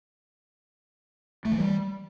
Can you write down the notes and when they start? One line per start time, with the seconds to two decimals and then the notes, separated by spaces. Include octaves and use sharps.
1.45 A3
1.52 E3
1.58 G3